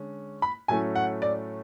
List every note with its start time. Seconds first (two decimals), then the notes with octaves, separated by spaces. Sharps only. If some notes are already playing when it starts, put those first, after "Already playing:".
Already playing: D3 G#3 C#4
0.42 B5
0.68 A2 F#3 A3 C#4 G#5
0.96 F#5
1.22 D5